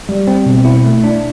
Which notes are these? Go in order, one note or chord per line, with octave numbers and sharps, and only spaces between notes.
G3
C4
B2
E4
A3
D4